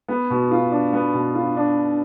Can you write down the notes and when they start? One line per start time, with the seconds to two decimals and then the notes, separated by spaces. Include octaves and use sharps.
0.08 B3
0.30 B2
0.51 F4
0.72 D4
0.93 B3
1.14 B2
1.35 F4
1.56 D4